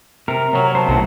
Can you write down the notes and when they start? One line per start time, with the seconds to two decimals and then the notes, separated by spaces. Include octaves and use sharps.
0.28 C3 A#4
0.53 C3 F#3 C#5
0.75 B3 C5 A5
0.89 B1 A2